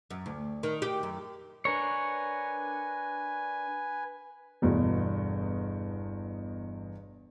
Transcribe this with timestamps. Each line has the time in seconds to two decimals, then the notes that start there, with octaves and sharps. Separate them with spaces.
0.10 F#2
0.26 D2
0.63 D#3
0.82 G4
1.03 F#2
1.65 D4 A#4 B4 C#5 G#5
4.62 G1 E2 B2